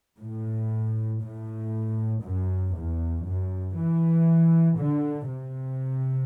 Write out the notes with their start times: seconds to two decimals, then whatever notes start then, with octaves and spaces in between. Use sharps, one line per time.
0.18 A2
1.20 A2
2.23 F#2
2.74 E2
3.24 F#2
3.76 E3
4.78 D3
5.29 C3